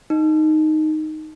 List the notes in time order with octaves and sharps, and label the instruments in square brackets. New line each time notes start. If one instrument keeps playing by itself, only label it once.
[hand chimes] D#4